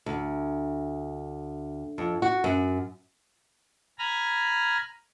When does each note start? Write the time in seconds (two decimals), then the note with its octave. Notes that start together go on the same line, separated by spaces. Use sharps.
0.06 D2
1.98 F2
2.22 F#4
2.44 F#2
3.99 G#5 A#5 B5 F6 A#6